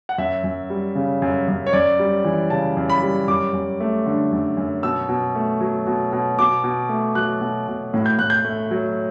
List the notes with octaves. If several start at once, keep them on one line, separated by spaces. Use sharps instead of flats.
F#5
F#2 E5
F#2
G3
C#3
F#2
F#2
C#5
F#2 D5
G3
E3
C#3 A5
F#2
B5
G3
F#2 D6
F#2
A3
D3
F#2
F#2
B2 E6
B2
A3
F#3
B2
B2
B2 D6
B2
A3
F#3 F#6
B2
B2
A2
G6
A2 F#6
G6
A3
F#3